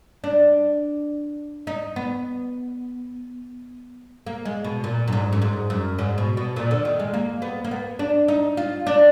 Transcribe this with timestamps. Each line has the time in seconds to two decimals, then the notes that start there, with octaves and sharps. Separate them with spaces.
0.24 D4
1.67 D#4
1.96 B3
4.27 A#3
4.45 G#3
4.64 B2
4.84 A#2
5.08 F#2
5.13 G#2
5.33 F#2
5.42 G#2
5.70 F#2
5.99 G#2
6.18 B2
6.37 B2
6.56 A#2
6.71 D3
6.85 D#3
7.00 G#3
7.14 A#3
7.42 B3
7.64 A#3
7.71 B3
7.99 D4
8.28 D#4
8.57 F4
8.87 D4